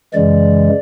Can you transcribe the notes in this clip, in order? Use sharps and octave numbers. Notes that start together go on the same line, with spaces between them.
F#2 C#3 E3 G#3 D5